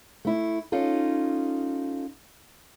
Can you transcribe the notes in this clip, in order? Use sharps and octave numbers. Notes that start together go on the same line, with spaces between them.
A3 E4
C#4 D#4 F4 A4